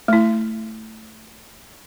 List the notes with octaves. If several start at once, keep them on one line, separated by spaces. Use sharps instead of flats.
A3 E4